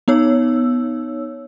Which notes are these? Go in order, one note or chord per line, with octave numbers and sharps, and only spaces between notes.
B3 D#4 C#5 E6